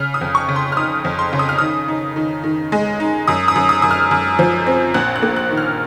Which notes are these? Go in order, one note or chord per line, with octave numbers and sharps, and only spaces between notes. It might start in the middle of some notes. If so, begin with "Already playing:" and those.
Already playing: C#3 F6
D#6
F2
C#6
C#3
C6
F6
D#4 D#6
F2
C6
C#3
D#6
F6
D#3 D#6
D#4
D#3
D#3
G#3
D#4
F#2 D#6
D#6
F#2
D#6
F#2 D#6
F6
F#2
F3
C4
A#1 F#6
F#6
A#3
F#6
D#3
F6